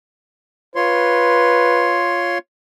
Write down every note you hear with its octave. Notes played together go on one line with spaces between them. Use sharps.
F4 B4 C#5 C6